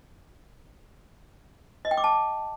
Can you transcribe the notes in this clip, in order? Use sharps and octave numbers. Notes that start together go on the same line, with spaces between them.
D#5
G5
D6
A5